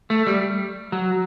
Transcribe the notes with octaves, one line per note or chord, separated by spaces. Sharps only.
A3
G3
F#3